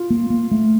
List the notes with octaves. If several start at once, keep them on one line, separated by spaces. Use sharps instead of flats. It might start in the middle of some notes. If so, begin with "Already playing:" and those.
Already playing: F4
A#3
A#3
A3